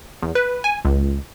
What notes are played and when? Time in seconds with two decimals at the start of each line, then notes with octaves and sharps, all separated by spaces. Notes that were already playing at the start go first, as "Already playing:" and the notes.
0.22 E2
0.35 B4
0.64 G#5
0.85 C#2